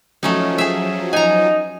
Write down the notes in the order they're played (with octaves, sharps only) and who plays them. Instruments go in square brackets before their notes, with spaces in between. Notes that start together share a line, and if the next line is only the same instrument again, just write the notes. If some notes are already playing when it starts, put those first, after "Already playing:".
[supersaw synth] F3 F#3 [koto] A3 C#4 D#4
[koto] G#4 E5
[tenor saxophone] D#4 [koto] G#5 A#5